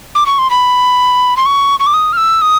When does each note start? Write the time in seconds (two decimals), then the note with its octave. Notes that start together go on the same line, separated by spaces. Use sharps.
0.15 D6
0.26 C#6
0.38 C6
0.51 B5
1.37 C6
1.46 C#6
1.80 C#6
1.86 D6
1.94 D#6
2.13 F6
2.17 E6
2.42 D#6